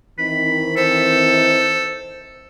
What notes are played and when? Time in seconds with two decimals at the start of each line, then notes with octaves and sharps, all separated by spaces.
0.19 D#3 E3 C4 B5
0.77 A4 C5